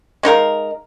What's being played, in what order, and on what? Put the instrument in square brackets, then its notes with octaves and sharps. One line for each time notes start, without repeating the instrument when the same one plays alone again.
[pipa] G#3 D#4 A#4 F5